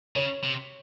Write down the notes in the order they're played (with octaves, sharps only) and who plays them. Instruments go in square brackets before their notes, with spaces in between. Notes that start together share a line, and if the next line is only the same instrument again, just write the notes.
[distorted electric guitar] C#3 [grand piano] C#5
[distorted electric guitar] C3